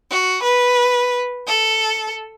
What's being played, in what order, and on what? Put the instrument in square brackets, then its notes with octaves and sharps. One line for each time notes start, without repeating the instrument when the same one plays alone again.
[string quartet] F#4
B4
A4